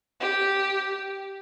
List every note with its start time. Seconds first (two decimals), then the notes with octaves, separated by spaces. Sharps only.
0.20 G4